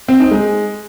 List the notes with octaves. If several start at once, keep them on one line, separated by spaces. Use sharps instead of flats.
C4
D#4
G#3